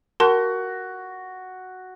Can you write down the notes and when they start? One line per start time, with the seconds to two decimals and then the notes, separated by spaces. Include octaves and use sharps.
0.20 F#4 A#4 A5 C6